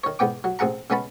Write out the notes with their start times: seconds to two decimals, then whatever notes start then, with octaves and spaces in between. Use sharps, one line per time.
0.04 D#3 C#5
0.19 E2 G#2 B3 G5 D6
0.44 F#3
0.59 A1 C4 G#4 F#5 A#5
0.90 C#3 G#3 B3 C#4 A5 B5